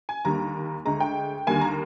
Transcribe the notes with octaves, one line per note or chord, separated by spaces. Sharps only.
G#5
D#2 D3 G3 A#3 A#5
D2 D3 G#3 A#5
G5
D#2 D3 G3 A#3 G#5
A#5